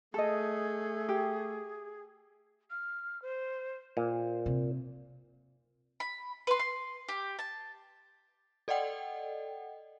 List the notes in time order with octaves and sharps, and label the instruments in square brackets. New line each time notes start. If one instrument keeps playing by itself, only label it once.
[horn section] A3 [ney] G#4 [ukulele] A4 D#5
[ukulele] G4
[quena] F6
C5
[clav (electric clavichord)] A#2 [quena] C5
[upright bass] C3
[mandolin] B5
B4 C6
C6
G4
A5
[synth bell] A4 D5 D#5 F#5 G5